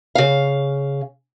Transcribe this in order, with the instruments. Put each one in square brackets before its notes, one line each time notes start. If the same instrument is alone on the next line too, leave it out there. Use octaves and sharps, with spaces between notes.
[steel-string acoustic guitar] C#3 F5